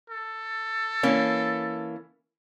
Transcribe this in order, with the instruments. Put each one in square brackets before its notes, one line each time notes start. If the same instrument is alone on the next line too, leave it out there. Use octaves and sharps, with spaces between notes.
[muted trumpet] A4
[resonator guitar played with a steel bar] E3 A#3 C#4